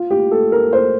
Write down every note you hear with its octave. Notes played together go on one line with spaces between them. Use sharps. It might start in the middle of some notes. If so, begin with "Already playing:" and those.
Already playing: F4
G4
A4
A#4
C5